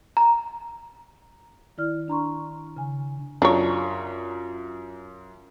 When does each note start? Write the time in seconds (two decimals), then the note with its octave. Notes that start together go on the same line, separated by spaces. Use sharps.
0.17 A#5
1.78 D#3 E4 D5 F6
2.08 D4 A#5 C6 C#6
2.77 C#3 G#5
3.42 F#2 D4 F4 C#5 A#5